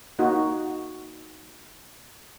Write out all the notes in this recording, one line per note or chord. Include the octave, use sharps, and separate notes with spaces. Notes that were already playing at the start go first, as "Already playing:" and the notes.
A#3 D#4 F#4